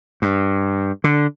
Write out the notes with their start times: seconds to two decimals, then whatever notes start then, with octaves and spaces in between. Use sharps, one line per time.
0.22 G2
1.04 D3